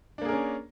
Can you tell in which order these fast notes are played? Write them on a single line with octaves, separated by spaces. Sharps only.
D4 A#3 G#4 A#4 C#4